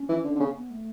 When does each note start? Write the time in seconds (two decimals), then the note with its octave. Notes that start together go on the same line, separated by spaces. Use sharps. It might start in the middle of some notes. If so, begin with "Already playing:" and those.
Already playing: C#4
0.09 E3
0.24 D3
0.35 D3
0.39 C#3 B3
0.55 B3
0.70 A3